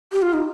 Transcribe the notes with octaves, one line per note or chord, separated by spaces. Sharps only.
G4
F4
D#4